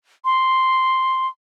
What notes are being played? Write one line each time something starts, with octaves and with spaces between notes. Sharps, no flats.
C6